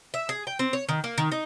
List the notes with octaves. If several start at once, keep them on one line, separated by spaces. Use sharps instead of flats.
E5
G#4
G5
C4
C#5
D#3
A#3
D#3
D#4